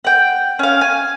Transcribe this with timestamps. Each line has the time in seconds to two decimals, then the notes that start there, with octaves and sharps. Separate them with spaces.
0.04 F#5 G5
0.59 C#4 F5
0.81 G#5